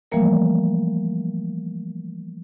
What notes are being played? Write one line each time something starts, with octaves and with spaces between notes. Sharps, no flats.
E3 F3 G3 A3 A#3 A#4